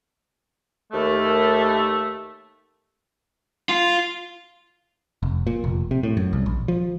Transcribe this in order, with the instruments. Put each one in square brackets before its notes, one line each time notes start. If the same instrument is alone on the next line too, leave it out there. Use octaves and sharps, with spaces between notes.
[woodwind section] D#2 A3
[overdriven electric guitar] F4
[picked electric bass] F1
A#2
F1
C3
A2
F#2
C2
A#1
F3